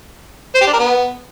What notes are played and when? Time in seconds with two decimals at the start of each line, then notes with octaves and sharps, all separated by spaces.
0.55 C5
0.61 G4
0.67 D4
0.73 A#4
0.79 B3